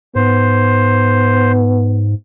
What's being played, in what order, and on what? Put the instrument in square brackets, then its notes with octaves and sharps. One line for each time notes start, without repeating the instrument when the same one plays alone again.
[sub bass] G#2 [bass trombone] B3 [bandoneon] C5